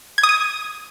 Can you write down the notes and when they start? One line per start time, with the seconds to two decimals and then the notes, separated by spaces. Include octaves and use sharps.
0.18 G#6
0.23 D#6
0.29 D#7